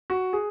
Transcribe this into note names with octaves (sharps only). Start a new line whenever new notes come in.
F#4
G#4